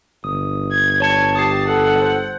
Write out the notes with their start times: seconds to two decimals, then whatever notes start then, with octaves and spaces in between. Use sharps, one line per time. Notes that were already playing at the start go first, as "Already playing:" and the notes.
0.24 G1 D#6
0.71 G#6
1.00 G3 C#5 A5 G#6 C#7
1.36 G4 A5 D#6 C7
1.68 A4 F#5
2.02 C5